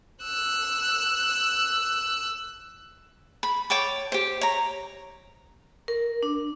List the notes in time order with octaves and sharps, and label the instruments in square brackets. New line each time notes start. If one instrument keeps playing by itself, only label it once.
[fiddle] E6 F#6
[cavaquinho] B5
C#5 G5 A5 D6
G4 C5
C#5 A#5
[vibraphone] A#4
D4